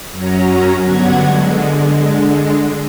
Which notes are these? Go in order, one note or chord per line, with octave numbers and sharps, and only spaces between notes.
F#2 F#3 C#4 A#5
G2 D3 F#3 B3 F#5 G#6
D3 G#3